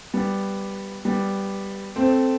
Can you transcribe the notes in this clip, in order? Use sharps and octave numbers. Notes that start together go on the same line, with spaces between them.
G3 B3
G3 B3
A3 C4